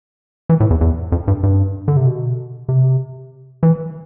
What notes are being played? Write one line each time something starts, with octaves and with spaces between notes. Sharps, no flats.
E3
A2
E2
E2
F2
G2
G2
D3
C3
B2
C3
E3